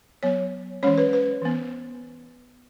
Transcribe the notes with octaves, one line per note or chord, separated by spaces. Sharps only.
F#3 B3 C#5
E3 G#3 C#4 C#5
B4
B4
E3 B3